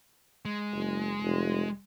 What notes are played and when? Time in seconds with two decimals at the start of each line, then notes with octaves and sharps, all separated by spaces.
0.45 G#3
0.74 F#1
1.22 F1